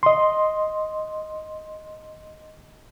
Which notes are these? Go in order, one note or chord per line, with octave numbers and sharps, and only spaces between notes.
D#5 C6